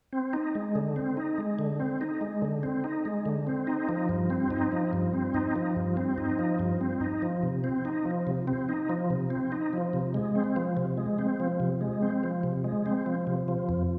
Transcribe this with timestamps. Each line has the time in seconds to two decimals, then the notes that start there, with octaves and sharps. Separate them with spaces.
0.13 C4
0.33 D#4
0.55 G#3
0.75 D3
0.96 C4
1.17 D#4
1.38 G#3
1.59 D3
1.80 C4
2.01 D#4
2.21 G#3
2.42 D3
2.63 C4
2.84 D#4
3.05 G#3
3.26 D3
3.47 C4
3.67 D#4
3.89 F3
4.09 G2
4.30 C4
4.50 D#4
4.72 F3
4.93 G2
5.14 C4
5.34 D#4
5.56 F3
5.76 G2
5.97 C4
6.18 D#4
6.39 F3
6.59 G2
6.81 C4
7.01 D#4
7.22 F3
7.43 C3
7.64 C4
7.85 D#4
8.05 F3
8.27 C3
8.48 C4
8.69 D#4
8.89 F3
9.10 C3
9.30 C4
9.52 D#4
9.73 F3
9.93 C3
10.14 G#3
10.35 C4
10.56 F3
10.77 C3
10.97 G#3
11.19 C4
11.40 F3
11.60 C3
11.81 G#3
12.02 C4
12.24 F3
12.43 C3
12.64 G#3
12.86 C4
13.06 F3
13.27 C3
13.48 F3
13.69 F2